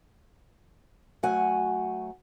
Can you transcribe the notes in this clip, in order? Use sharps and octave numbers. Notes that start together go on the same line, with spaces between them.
F#3 A3 F#4 F#5 G#5